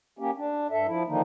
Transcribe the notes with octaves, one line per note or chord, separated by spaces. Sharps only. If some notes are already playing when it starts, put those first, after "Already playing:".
A#3 C#4 G4
D4
G2 A4 E5
F3 E4
D3 D#3 F3 A#3 D#4